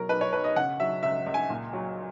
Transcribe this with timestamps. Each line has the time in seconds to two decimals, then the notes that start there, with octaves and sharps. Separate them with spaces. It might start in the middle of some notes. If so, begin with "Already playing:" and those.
Already playing: B2 F#3 A#4
0.09 B1 B4
0.21 C#5
0.33 B1 B4
0.44 D#5
0.56 C#3 F#5
0.80 F#3 E5
1.03 C#2 E5
1.26 C#2
1.34 G#5
1.50 A#2
1.73 F#3